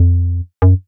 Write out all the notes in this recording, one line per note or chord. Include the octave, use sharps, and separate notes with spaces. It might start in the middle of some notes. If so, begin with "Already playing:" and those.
Already playing: F2
F#2